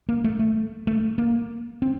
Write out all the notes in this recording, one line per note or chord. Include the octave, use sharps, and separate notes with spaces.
A#3
A3
A3
A3
A#3
C4